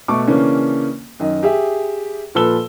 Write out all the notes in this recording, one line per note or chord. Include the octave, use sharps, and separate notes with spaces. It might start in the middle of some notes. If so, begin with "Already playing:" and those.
B2 A3 A4 C#6 D6
C#3 E3 A#3 C#4 D4
F#2 D#3 D#5
G4 G#4 E5
A#2 F3 A4 B4 E6 G7